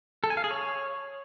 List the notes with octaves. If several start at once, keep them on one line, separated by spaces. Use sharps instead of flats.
A4
G#5
F5
G#4
C#5